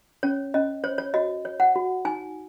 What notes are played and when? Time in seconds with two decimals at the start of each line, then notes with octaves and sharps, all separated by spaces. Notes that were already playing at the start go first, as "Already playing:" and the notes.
0.23 C#4 C#5
0.54 C#4 D#5
0.84 C5 C#5
0.98 C#5
1.14 F#4 D#5
1.45 C#5
1.60 F#5
1.75 F#4
2.05 D#4 G#5